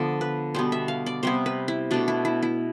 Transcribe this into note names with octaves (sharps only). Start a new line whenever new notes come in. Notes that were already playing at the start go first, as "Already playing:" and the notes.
Already playing: D3 F3 B3 A4
B4
B2 G3 B3 C5
E5
F5
D5
C3 G3 B3 C5
B4
E4
B2 A3 D4
E4
E4
E4